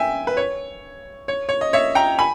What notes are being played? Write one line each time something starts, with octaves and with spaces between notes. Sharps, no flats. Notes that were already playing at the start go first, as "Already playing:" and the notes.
Already playing: E5 G5 G#5
B4
C#5
C#5
C#5
D#5
C#5 E5
G5 A#5
G#5 B5